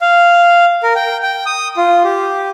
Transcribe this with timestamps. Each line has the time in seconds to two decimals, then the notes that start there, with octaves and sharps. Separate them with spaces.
0.01 F5
0.83 A#4
0.96 G5
1.23 G5
1.46 D#6
1.77 F4
2.04 G4